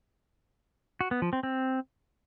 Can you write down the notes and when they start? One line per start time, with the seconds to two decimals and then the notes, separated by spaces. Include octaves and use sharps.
1.01 F#4
1.11 B3
1.22 F3
1.33 C4
1.43 C4